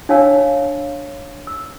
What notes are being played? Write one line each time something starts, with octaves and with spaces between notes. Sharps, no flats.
D4 C#5 F5 G5 A5 E6
E6